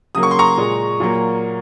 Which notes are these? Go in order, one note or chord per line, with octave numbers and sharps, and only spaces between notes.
C#3 F#3 A#3 D#6
C#6
C6
A#5 C#6
A#2 G#3
A#2 F#3 A#3